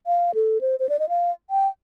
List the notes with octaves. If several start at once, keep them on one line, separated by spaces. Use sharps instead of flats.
F5
A4
C5
C5
D5
D#5
F5
G5